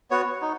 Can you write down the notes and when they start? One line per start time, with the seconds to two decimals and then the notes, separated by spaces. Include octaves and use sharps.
0.11 B3 F#4 C#5
0.42 D#4